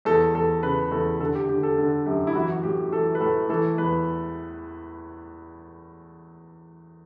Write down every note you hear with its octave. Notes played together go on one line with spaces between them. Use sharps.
E2 A4
E2 A4
C#3 B4
E2 A4
D3 A4
G4
D3 G4
A4
D3 A4
F#2 G4
E4
E3 F#4
F#4
A2 G4
E3 A4
B4
A2 A4
E3 A4
E2 B4